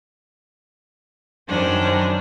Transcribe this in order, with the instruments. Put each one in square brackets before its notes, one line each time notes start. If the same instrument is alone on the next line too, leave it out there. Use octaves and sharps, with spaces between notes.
[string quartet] F#2 D#3 C#4 D4 C5